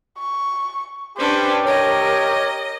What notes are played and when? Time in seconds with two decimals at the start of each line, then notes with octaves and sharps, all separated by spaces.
0.19 C#6
1.18 C#4 D4 G4 B4 C5
1.65 A#4 C#5 D#5